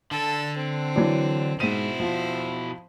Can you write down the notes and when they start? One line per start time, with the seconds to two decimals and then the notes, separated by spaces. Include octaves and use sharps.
0.11 D3 A4
0.57 C4
0.96 E3 F#3 D4
1.60 G#2 B2 E4 C5 D#7
2.00 F3